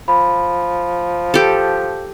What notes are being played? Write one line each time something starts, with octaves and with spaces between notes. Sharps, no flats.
F3 B5
G4 A4